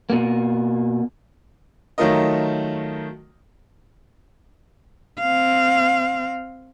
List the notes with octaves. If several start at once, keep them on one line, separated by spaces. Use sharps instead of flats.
B2 A#3
D#3 F#3 A3 F4 A#4 D#5
C4 F5